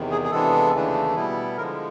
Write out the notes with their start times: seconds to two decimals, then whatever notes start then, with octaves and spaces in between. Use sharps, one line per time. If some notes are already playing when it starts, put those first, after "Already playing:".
Already playing: E2 C3 D#3
0.11 G#4
0.25 G#4
0.31 C3 E3 G#3 B3 D4 A4
0.73 D#2 C#3 E3 A3 D4
1.15 B2 G3 B3 E4
1.57 D3 F3 G#3 A#4